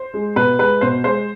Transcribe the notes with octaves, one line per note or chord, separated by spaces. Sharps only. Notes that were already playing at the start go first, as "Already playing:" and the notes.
Already playing: C5
G#3
B2 B4
G#3 B4
B2 C5
G#3 C5